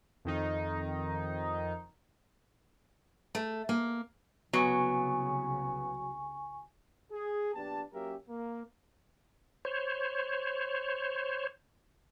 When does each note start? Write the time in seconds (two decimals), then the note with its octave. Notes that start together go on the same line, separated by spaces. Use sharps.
0.25 F2 D#3 D#4
3.35 A3
3.69 A#3
4.53 C2 C#3 F#3 B3 G#5 C#6
7.11 G#4
7.54 A#1 B3 D4 G4 A5
7.93 F#3 A#3 C#4 G4 A#4 E5
8.28 A#3
9.65 C5 C#5